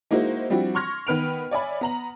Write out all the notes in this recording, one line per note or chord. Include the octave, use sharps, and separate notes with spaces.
G#3 A#3 D#4 E4 F#4 C5
F3 G3 C4 D4 E4 F#4
C6 C#6 F6 G#6 A#6
D#3 B3 B4 F6 D7 F7
C#5 D5 E5 G#5 B5
B3 A#5 F#7